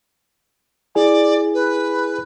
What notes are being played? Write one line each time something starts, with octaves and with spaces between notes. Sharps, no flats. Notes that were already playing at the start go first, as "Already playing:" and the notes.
E4 G#4 D5 G#5
B4